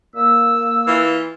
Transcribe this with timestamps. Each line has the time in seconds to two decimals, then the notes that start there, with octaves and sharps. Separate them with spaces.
0.15 A#3 E6
0.87 E3 F4